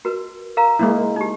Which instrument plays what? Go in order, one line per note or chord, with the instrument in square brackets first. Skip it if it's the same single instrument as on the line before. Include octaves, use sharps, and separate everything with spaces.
[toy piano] F#4 A#4 B4
A#4 F5 A#5
[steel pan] G#3 A#3 E4
[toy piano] D#4 G4